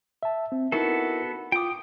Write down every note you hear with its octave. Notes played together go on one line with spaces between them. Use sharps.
E5 A5
C4
B3 D#4 E4 F#4 A4 A#4
F4 G5 D6 D#6